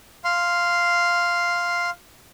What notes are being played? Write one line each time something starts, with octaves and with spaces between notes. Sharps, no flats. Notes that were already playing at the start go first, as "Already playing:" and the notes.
F5 C6